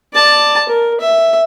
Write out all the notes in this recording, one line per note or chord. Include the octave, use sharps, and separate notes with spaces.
D5 A5
A#4
E5